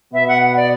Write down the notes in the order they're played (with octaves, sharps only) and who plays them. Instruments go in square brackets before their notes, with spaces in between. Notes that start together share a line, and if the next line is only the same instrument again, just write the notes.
[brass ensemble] B2 B3 [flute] E5
[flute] F#5
F#5
D5